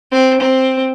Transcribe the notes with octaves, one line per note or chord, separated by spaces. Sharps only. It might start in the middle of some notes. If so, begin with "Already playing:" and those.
C4
C4